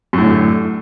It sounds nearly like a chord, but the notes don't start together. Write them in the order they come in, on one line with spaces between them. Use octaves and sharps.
F#2 A2 D3